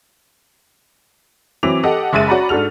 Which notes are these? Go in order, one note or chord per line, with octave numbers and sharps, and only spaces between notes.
E3 F#3 C4 D6 D7 F7
G4 A4 D#5 F#5
F#1 G#3 E5 C6 A6 D#7
C#4 F#4 D5 F#5 A#5 B5
G#2 D4 F#4 A4 F6 F7